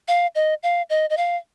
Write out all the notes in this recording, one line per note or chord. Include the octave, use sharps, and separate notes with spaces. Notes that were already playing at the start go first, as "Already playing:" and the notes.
F5
D#5
F5
D#5
D#5
F5